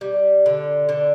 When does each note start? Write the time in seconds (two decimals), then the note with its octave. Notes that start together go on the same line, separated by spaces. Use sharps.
0.01 G3
0.46 D3
0.89 D3